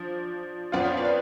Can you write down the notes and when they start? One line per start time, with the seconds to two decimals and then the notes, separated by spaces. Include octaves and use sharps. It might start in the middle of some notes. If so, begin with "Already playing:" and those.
Already playing: F3 D4
0.72 F2 F3 B3 F4 D5 F#5
0.85 C#5 F5
0.97 B4 D5
1.05 F5